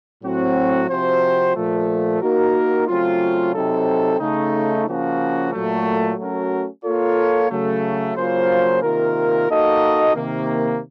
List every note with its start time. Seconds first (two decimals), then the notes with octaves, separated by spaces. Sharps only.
0.23 A2 F#3 C4 F#4
0.89 C3 F3 C4 F#4 C5
1.55 A#2 F3 A3
2.21 A#3 D#4 F#4 A#4
2.88 C#3 F#3 A3 C4 F4
3.54 C3 F#3 C4 D#4 A4
4.20 C#3 A3 D#4
4.86 C#3 F3 A#3 C#4 F#4
5.52 A#2 F#3 A3
6.18 F#3 A3 C#4 F#4 A#4
6.84 A#3 F4 A4 C#5
7.50 C#3 F#3 A3
8.16 C#3 F#3 A#3 F4 C5
8.82 C3 D#3 A#3 F4 A#4
9.49 A#3 D#4 F#4 A4 D#5
10.15 C3 D#3 A#3